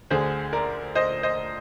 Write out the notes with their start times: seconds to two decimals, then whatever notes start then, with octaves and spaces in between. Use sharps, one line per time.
0.10 D2 D3 G#4 C5
0.53 A#4 D5
0.95 C5 D#5
1.23 C5 D#5